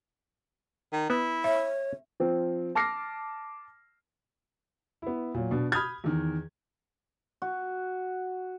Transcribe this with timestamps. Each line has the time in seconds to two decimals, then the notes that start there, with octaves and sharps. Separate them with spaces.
0.93 D#3
1.10 B3 E4
1.44 C#5 E5
2.20 F3 C4
2.75 A5 D6 F6 A#6 C7
5.02 B3 E4
5.34 A#2 F#3
5.51 B2 D4
5.72 B5 D#6 F6 G6 G#6
6.04 E2 D#3
7.42 F#4